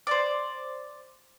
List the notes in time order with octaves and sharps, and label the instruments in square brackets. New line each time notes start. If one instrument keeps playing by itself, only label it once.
[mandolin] C5 D5